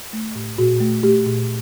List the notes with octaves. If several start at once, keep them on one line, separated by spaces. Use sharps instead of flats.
A3
A2
A#2 F#4
A3
A3 G4
A#2